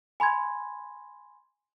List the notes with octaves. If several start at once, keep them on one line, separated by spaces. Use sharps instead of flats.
G#5 B5 C6 G#6